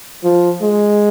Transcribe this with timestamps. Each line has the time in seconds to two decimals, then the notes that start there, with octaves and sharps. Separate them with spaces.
0.24 F3
0.62 G#3